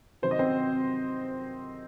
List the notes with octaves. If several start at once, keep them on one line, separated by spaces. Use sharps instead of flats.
C3 D#3 F#3 C5
D#5
C4 C5